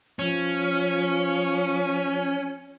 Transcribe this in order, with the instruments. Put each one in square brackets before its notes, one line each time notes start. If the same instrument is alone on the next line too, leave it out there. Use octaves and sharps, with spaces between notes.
[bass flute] F3 [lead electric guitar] C#4